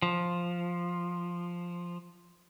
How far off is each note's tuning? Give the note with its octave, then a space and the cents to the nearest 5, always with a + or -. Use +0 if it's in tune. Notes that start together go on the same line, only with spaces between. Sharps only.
F3 +0